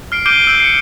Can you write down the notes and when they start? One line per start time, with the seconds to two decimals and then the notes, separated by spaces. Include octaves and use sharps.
0.12 F6 C7 D7
0.26 D6 G6 C7 D7 D#7 G7
0.47 E6 G6 D7
0.60 C7 C#7